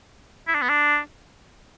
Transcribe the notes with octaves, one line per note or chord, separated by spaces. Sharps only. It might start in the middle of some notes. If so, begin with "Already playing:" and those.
E4
D4
B3
D4